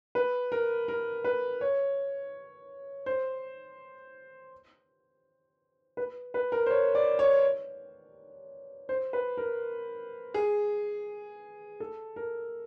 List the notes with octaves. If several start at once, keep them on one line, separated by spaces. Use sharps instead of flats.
B4
A#4
A#4
B4
C#5
C5
B4
B4
A#4
C5
C#5
D5
C#5
C5
B4
A#4
G#4
A4
A#4